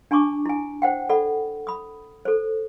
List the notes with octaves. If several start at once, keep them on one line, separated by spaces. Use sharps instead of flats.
D4 G#5 A5 C#6 D6
E4 G#5
C5 F#5 G5
A4 D5 F#5 B5
B5 D#6
A4 C5